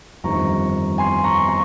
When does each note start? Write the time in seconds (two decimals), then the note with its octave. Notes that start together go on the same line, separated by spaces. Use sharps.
0.23 G1 F2 D#3 G3 A#5 C#6
0.98 G#5 C6
1.24 A#5 C#6
1.48 A#5 C#6